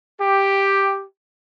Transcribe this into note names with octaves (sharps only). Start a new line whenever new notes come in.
G4